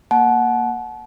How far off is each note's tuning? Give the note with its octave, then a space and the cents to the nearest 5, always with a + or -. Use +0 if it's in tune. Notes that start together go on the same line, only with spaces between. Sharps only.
A#3 +0 F#5 +0 A5 -35